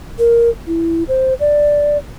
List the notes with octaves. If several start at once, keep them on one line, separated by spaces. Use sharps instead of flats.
A#4
E4
C5
D5